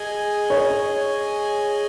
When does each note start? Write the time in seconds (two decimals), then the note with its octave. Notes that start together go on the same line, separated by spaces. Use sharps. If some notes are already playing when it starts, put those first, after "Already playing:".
Already playing: G#4 D#5 G#5
0.50 C#5